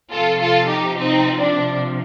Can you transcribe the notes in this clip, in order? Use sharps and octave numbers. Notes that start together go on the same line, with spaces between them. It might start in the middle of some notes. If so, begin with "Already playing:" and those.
C3 F3 F4 A4
F4 A4
D#4 G4
C4 D#4
D4